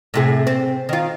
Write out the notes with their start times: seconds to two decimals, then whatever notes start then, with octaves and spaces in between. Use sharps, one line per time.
0.14 A2 C3 G#4
0.47 C4
0.89 D#3 F4